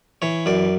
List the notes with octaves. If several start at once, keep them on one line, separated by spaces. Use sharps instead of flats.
E3 C#5
F#2 D5